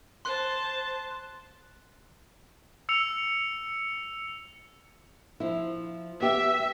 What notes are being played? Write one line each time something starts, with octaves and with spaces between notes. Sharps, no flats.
C5 A5 C6 F#6
E6 C#7 F7
F3 E4
B3 G4 E5